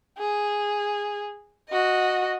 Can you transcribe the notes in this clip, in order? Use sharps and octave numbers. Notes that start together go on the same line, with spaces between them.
G#4
F#4 D#5